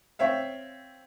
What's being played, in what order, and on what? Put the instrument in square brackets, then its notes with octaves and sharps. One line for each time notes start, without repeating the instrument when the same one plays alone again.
[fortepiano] C4 C#5 E5 F5